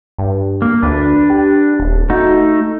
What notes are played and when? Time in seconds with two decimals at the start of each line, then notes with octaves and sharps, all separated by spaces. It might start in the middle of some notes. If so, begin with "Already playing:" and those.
0.19 G2
0.62 A#3
0.83 D2 D4 B4
1.30 G4
1.80 D#1
2.10 A3 D#4 F#4